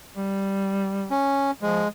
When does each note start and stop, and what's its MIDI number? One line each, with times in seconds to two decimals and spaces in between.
0.16 1.10 55
1.11 1.51 61
1.62 1.83 53
1.62 1.88 56